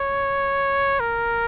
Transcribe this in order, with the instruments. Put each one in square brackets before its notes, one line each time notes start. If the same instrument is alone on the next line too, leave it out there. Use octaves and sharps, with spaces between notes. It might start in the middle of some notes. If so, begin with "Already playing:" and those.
Already playing: [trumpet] C#5
A#4